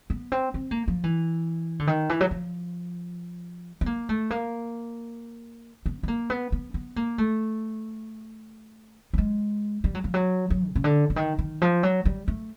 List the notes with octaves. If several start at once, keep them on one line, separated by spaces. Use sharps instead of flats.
B3
C4
C4
A#3
F3
E3
D3
D#3
E3
F#3
F3
B3
A#3
A3
A#3
B3
B3
A#3
B3
B3
B3
A#3
A3
G3
G#3
G3
F#3
F3
F#3
F#3
C3
C#3
D3
D3
D#3
D#3
F3
F#3
G3
A3